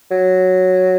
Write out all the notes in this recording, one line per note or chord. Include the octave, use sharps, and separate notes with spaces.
F#3